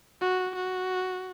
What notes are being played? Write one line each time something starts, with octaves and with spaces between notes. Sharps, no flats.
F#4
F#4